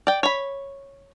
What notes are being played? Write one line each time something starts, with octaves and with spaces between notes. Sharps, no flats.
D5 G5
C#5 B5